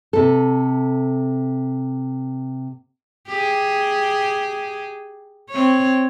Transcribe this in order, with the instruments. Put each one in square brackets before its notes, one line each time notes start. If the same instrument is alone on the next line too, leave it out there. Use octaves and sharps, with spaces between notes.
[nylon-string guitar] C3 A4
[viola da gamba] G4 G#4
C4 C#5